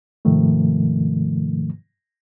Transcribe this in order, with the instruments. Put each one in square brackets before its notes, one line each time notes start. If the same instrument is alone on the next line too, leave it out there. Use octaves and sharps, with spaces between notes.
[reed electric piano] G#2 C3 D#3 F3 A3